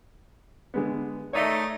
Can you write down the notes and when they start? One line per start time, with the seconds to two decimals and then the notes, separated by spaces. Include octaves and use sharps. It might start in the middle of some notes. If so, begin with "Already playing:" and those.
0.74 D3 G#3 B3
1.33 A3 D#4 C#5 D5 E5